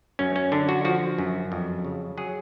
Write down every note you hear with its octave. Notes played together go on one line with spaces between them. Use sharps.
F#2 C#4
C#4
D3 D4
F#4
F3 F#4
F#2
F2
C#3
F#3 G#4